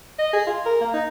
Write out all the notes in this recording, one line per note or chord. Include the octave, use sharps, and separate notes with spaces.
D#5
G#4
F4
A#4
A#3
D#4